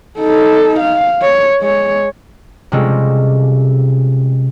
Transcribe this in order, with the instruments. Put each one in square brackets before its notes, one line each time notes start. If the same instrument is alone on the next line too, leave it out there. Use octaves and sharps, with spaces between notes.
[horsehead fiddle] D#4 A4
F5
C#5
G#3 C#5
[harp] C3 G3 G#3 C#4 F4 A4